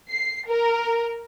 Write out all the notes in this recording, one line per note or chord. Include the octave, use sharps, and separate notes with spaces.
C7
A#4